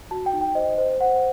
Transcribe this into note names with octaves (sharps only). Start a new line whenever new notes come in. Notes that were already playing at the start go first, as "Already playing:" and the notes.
F#4 A5
G5
D#4
G5
C5 D#5
C5
C5 F#5